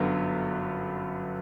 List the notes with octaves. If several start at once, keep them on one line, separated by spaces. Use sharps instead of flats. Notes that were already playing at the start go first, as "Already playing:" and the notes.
Already playing: G1 F#2 D3 F#3 B3